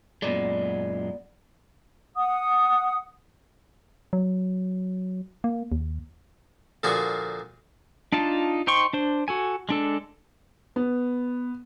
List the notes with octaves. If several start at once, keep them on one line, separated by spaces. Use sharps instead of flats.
F#2 A#2 G#3 B3 D5
F#5 D#6
F#3
A#3
D#2
A#2 D3 F3 F4 F#4 G#4
D4 D#4 F4 A5
D#4 C5 G5 C6 C#6
D4 C5
F#4 A4 G#5
G#3 D4 A4
B3